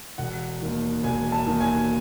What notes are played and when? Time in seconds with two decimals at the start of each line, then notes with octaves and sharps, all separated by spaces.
0.18 E1 F#5
0.62 D#2 D#3
1.03 E1 G#5
1.32 A5
1.47 D#2 D#3
1.61 G#5